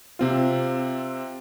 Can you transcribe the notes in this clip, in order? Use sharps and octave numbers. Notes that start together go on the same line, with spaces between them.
C3 C4 F4